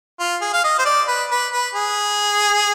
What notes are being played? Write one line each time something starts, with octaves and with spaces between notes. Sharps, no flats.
F4
G#4
F5
D#5
C5
D5
B4
B4
B4
G#4